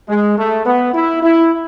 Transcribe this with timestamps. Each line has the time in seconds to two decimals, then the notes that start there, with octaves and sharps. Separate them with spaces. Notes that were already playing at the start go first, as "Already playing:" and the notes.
0.09 G#3
0.38 A3
0.66 B3
0.94 E4
1.23 E4